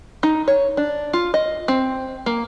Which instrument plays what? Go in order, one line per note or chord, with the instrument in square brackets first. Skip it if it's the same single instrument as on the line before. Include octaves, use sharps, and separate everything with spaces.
[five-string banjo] D#4
C#5
D4
F4
D#5
C4
A#3